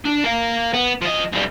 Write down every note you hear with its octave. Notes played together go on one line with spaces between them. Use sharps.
D4
A#4 F5
B3
F3 D#5
B1 G3